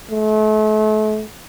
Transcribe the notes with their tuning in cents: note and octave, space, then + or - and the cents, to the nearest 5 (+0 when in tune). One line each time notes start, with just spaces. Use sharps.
A3 -40